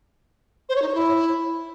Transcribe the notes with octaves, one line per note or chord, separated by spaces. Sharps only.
C5
C#5
D#4
C#5
E4